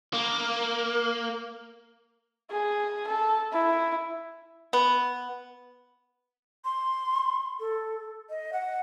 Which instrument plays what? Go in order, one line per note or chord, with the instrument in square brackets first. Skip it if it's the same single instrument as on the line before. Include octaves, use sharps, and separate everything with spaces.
[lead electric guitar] A#3
[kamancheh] G#4
A4
E4
[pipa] B3
[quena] C6
A4
D#5
F#5